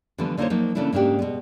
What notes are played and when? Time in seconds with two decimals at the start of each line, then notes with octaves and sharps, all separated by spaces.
0.18 D3 E3 F3 G3 A3 B3
0.38 D3 A#3 D#4 F4 C5 C#5
0.50 F3 F#3 A#3 D#4
0.75 C#3 E3 A3 A#3 D4 E4
0.93 G#2 C#3 A#3 D4 F#4 G4
1.19 B2 G#3 B3